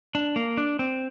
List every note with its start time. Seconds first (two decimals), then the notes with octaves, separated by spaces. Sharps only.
0.15 D4
0.36 A#3
0.57 D4
0.79 C4